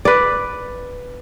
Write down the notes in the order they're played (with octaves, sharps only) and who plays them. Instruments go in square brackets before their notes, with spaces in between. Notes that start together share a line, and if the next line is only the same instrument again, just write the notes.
[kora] B4 D5